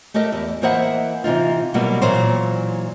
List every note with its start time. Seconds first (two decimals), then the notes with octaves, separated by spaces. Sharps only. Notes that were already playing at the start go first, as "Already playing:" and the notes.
0.14 A3 G4 A#4 D#5 E5
0.32 E2
0.62 E3 A#3 C5 D#5 E5 F#5
1.24 C3 E3 D#4 F4
1.74 B2 F#3 G3 A#3 B3
2.02 A#2 E3 F#3 C5